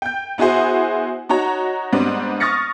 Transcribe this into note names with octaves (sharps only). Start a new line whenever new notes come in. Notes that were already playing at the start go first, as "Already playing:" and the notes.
G5 G6
B3 E4 F#4 G#4 C5
D#4 F#4 C#5 A#5
G#2 G3 B3 C4 D4
C#6 D#6 F6 A6 A#6 C#7